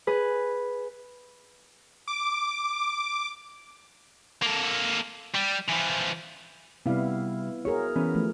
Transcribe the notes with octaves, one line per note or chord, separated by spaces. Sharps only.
G#4 B4
D6
A#3 A4
G3
E3 F3
C3 G3 B3 E4 F5
F#4 G#4 A#4 C#5
E3 B3 C#4
F3 A3